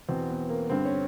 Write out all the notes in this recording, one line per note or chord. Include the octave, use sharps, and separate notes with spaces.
E2 B2 C4
B3
A#3
G2 D3 C4
C#4